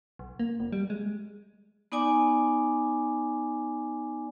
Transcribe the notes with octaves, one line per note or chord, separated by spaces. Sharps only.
B1
A#3
F1
G3
G#3
B3 D#4 D5 G#5 D6